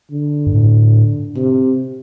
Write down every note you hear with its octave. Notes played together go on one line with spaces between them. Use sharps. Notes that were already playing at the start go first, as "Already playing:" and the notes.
D3
G2
A2
C3